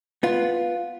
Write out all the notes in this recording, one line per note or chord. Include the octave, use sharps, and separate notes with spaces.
B3 F4